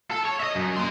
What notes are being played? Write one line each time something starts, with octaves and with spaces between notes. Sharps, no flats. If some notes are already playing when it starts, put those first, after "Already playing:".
A4
C#5
D#5 E5
F#2
A#3 C6